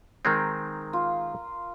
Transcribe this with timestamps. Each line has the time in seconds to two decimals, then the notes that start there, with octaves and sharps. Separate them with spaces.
0.25 D#3 G#3 C4 A#4
0.93 F4